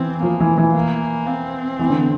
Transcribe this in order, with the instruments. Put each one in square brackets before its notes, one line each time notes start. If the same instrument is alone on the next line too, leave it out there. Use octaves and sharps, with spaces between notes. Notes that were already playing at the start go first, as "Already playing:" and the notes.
Already playing: [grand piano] E3 [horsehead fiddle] C4
[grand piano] F3 [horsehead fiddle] A#3
[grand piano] E3
E3
[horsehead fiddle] A#3
C4
[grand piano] E3
D3